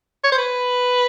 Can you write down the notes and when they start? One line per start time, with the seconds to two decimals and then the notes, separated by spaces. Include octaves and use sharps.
0.24 C#5
0.32 C5
0.38 B4